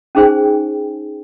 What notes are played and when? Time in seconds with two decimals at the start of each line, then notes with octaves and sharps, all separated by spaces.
0.15 C#4 D#4 G#4 C5 G5 G#5